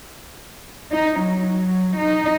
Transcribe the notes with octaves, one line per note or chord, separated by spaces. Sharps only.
D#4
F#3
D#4